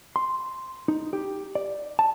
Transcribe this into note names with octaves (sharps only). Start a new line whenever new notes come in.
C6
D#4
G4
D5
A5